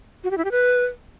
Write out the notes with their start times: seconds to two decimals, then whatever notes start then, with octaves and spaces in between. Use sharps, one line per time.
0.24 F#4
0.31 G4
0.38 E4
0.45 G4
0.51 B4